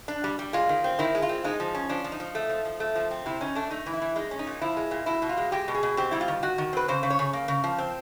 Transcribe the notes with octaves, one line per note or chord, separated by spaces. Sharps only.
D4
G3
G3
G#3 F4
D#3
C4
D#3 E4
G#3
F4
C4
G#3 D#4
F3
C#4
F3 D4
F3
D#4
F3
A3
F3
F3
A3
F3
C4
C3 E4
C#4 D#4
A3 D4
A3 D#4
E3
E4
E3
G#3 D#4
C#4
D#4
A#2
F3 E4
G#3
A#2
B2 E4
B2
F4
G#3
G#3 G4
B2
G#4
B2
C4 G4
G3 E4
F4
D#3
D#3 F#4
D#3
C4 B4
C#3 C5
C#3
C#5
C#3
A#3
C#3
F3
C4